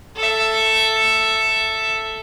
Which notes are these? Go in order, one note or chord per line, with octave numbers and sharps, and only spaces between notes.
A4 E5